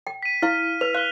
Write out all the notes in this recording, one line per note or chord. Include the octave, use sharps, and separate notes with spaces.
G5
B6 D#7
E4 F5 F6 B6
B4 F7
F5 F#6 G7